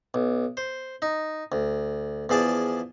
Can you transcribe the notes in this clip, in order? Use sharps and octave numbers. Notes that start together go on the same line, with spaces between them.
B1
C5
D#4
D2
E2 F3 G#4 D5 A5